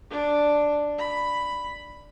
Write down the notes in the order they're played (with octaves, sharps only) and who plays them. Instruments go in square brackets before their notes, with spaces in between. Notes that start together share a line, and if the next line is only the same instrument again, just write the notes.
[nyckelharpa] D4
B5